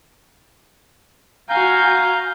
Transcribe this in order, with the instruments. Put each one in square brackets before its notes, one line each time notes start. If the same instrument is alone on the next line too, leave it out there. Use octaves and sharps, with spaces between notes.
[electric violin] F#4 G#5 [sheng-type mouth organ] F5 A#5 G6